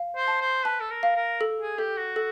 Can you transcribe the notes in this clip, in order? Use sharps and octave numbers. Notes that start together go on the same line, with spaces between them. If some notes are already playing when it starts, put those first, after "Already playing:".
Already playing: F5
C5
A5
C5
B4 A5
A4
A#4
F5
A#4
A4
G#4
G4 A4
F#4
A4